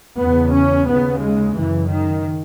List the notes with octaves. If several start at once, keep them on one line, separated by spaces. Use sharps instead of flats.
E2 C#3 B3
C#4
D#2 C#3 B3
G#3
F#2 C#3 E3
D#3